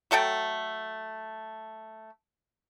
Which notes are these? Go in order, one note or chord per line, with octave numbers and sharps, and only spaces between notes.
F#3 A3 A4 G5